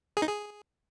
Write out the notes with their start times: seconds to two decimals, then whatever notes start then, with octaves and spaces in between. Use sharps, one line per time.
0.17 G#4
0.22 D#4
0.27 G#4